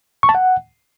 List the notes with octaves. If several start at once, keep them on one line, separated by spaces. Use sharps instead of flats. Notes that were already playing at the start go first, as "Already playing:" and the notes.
C#6
A5
F#5